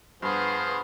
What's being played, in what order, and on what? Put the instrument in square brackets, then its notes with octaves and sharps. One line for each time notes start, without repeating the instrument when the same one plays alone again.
[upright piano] G2 [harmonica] F3 G#4 C5 [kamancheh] B3 B4